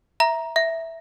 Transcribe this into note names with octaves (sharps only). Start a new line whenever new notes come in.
E5 A#5
E5